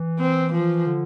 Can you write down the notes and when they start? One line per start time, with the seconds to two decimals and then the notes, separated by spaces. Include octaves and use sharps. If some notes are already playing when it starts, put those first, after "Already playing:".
Already playing: E3
0.19 C4
0.53 F3
0.87 D3